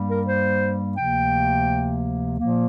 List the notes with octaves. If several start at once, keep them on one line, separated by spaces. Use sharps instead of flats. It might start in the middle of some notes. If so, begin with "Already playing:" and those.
Already playing: G2 G3 A#3
A#4
C5
D2 C3 F3 A#3 G5
A#2 F3 A#3